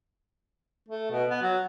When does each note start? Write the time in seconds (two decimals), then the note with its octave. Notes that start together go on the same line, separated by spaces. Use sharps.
0.88 A3
1.11 B2
1.30 B3
1.42 F#3